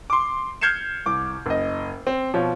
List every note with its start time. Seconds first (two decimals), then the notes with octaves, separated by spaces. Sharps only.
0.10 C6 D6
0.61 F6 G6 G#6 C7 C#7 E7
1.06 C2 D6
1.46 F#1 D#5
2.07 C4
2.34 B2 F3 C#5